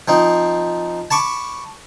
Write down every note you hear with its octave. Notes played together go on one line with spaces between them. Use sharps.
F3 C4 D#4
A5 B5 C#6 D6